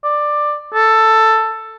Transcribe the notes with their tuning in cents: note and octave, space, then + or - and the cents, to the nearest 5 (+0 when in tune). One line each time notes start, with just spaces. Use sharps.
D5 +10
A4 +10